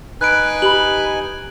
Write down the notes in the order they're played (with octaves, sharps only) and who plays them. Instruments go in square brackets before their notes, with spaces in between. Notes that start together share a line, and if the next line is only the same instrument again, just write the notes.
[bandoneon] D#4 G#5 [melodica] B4 [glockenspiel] F#6 D7
[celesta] G4 B5 [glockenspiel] F#7